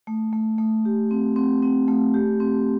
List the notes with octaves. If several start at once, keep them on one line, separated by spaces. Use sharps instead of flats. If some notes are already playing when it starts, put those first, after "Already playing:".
A3
A3
A3
G4
C4
C4
C4
A3
G4
C4